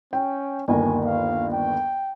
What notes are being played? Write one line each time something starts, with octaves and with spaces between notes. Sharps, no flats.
C#4 G5
G1 D#2 A#4 G#5
F5
G5